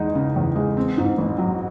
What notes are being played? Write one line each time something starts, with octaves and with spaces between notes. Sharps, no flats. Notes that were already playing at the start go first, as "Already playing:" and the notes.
Already playing: E2 G#3 D#4
C#3
E2
G#3
C4
G#2
A1
F#3